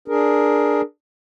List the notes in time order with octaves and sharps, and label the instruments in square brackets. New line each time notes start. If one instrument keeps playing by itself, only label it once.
[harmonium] D4 G#4 A#4